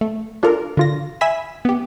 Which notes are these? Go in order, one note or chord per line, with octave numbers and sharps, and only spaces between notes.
A3
D4 F4 A4 A#4
D3 F4 A#6
E5 G#5 B5 B6 E7
B3 G4